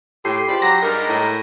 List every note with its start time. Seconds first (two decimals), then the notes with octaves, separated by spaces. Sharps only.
0.25 A2 G4 C6 C7
0.48 C#2 C5 D5 B5
0.62 F#3 A#6
0.83 G2 G3 G#3 D#4 A#4
1.08 A2